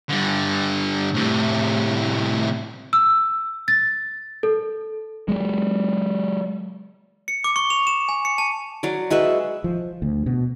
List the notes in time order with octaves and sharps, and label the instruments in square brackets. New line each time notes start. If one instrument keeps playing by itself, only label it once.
[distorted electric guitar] G2 D3
A2 C3
[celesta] E6
A6
A4
[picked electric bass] F#3 G#3
[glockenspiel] C#7
D6
C#6
F7
E7
G#5
C#7
A5
[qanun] F#3 D5
G#3 F#4 B4 E5
[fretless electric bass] F3
D2
B2